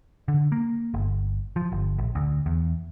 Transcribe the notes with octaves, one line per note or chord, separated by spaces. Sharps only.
D3
A#3
G1
F3
G1
A#1
D2
E2